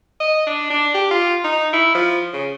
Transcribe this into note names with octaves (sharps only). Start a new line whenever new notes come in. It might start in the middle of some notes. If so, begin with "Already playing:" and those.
D#5
D4
D4
G4
F4
D#4
E4
F3
C#3